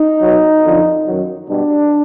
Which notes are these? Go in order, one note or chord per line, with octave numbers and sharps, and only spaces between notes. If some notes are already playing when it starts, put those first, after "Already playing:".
Already playing: D#4
B2 F#3
F2 D3 F3
F#2 D#3 F#3
B2 G3 D4